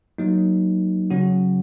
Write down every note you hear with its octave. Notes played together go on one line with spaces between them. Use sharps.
F#3 A#3 D#4
C#3 F#3 C#4 F#4